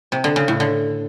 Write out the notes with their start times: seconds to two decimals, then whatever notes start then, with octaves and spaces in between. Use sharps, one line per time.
0.12 C3
0.24 D3
0.36 C#3
0.48 A2
0.60 D3